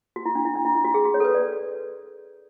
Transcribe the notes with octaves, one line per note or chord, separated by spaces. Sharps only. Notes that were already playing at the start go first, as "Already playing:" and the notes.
F#4
E4
D4
E4
D4
E4
E4
F#4
G#4
F#4
C#5
A4
B4
D5